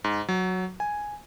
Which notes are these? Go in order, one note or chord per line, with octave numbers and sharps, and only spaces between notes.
G#2
F#3
G#5